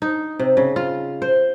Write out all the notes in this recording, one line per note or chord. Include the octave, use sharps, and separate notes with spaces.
D#4
C3
C#3
F4
C5